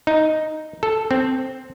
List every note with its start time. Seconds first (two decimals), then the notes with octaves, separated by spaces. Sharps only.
0.07 D#4
0.83 A4
1.11 C4